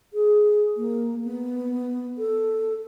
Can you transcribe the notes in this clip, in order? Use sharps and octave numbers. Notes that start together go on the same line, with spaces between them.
G#4
A#3
B3
A4